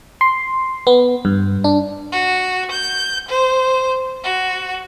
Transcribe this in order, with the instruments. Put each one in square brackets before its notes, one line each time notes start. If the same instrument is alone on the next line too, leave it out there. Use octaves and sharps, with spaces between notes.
[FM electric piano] C6
B3
G2
D4
[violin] F#4
G6
C5
F#4